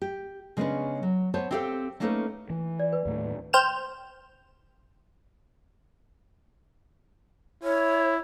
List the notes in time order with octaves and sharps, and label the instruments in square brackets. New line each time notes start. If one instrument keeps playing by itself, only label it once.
[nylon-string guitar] G4
C#3 G#3 B3 C#4 D4 B4
F#3
B3 C5 C#5 A5
C4 E4 G4 A4 C5 F5
A3 A#3 C#4 D#4 A4 B4
[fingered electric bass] E3
[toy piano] D5
B4
[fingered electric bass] D#2 A2 A3
[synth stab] C5 G5 F6 E7
[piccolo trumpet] E4 [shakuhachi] C#5